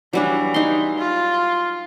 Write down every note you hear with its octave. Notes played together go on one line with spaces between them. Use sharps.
E3 F#3 G3 D4
D#4 C6
F4